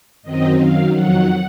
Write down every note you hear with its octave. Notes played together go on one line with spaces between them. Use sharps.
F#2 D#3 F#3 C4 D#5
F#2 D#3 F#3 F5
F2 D#3 F#3 F#5